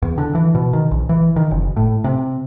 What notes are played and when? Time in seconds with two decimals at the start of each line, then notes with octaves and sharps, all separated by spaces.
0.02 E2
0.18 D3
0.35 E3
0.55 B2
0.73 D#3
0.91 A#1
1.09 E3
1.36 D#3
1.51 F#1
1.76 A2
2.04 C3